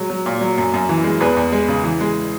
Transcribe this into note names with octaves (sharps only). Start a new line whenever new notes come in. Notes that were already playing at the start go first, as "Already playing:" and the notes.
Already playing: F#3 G#3
F#3
A#2
F#3
F#2
F#2
E3
G#3
E2 G#4 B4
E2
G#3
C#3
E3
G#3